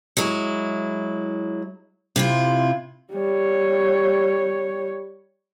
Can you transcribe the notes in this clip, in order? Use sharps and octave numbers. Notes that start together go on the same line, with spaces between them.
F#3 G#3 E4
C3 E4 F4
G3 C#5